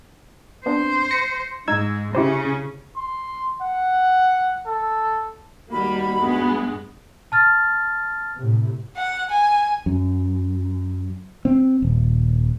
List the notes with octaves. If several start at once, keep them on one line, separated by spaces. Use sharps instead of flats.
B3 C4 D4 C5
A#6 C#7
G#2 D#4 E6 G#6
C#3 C#4 E4 G4 C5
C6
F#5
A4
D#2 G3 A#3 D#4 F#4 B5
G2 G#3 B3
A5 F6 A6
A2 C3
F#5
G#5
F#2
C4
D#1